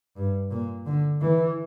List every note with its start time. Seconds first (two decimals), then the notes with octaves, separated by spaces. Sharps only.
0.16 G2
0.51 A#2
0.86 D3
1.21 E3